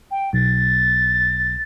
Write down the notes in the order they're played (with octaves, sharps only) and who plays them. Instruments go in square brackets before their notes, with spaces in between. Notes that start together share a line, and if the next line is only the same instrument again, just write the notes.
[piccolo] G5
[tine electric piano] B1 [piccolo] A6